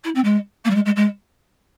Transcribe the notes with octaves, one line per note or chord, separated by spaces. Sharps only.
E4
C4
G#3
A#3
G3
G#3
G#3
G#3